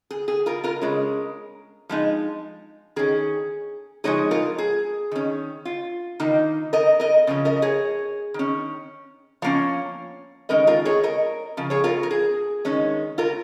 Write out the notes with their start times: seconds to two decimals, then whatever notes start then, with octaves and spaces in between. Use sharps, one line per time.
0.10 G#4
0.28 G#4
0.46 F4 A#4
0.64 F4 A#4
0.81 C#3 G#3 C#4
1.89 F3 G#3 D#4
2.96 D#3 C#4 G#4
4.04 F3 G#3 D#4 G#4 C#5
4.31 F4 A#4
4.58 G#4
5.11 D#3 C#4
5.65 F4
6.20 D#3 A#3 D#4
6.73 A#4 D#5
7.00 A#4 D#5
7.27 C#3 F3 C#4
7.45 A#4 D#5
7.62 G#4 C#5
8.34 D#3 C#4
9.42 F3 A#3 C#4 C#5 F5
10.49 D#3 G#3 C#4 A#4 D#5
10.67 F4 A#4
10.85 G#4 C#5
11.03 A#4 D#5
11.57 C#3 F3
11.70 G#4 C#5
11.84 F4 A#4
12.03 A#4
12.11 G#4
12.65 D#3 G#3 C#4
13.18 F4 A#4